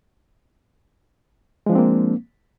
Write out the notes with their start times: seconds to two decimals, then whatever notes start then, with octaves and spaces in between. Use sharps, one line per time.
1.66 G#3
1.69 F3
1.72 D4
1.75 C4
1.78 A#3